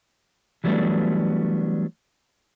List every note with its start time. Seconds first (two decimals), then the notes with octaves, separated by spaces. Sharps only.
0.64 E3 F#3 G3 A3 B3 D4